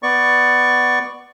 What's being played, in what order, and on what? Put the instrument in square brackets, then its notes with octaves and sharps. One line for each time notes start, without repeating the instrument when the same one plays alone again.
[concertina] B3 D5 C#6